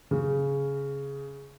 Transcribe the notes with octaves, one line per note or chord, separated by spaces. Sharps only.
C#3